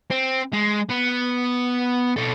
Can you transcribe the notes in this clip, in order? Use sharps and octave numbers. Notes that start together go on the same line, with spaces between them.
C4
G#3
B3
B2 A4